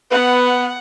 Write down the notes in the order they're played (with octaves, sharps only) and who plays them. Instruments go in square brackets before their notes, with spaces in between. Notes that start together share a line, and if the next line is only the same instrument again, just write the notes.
[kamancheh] B3 [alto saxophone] B4 [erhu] F#5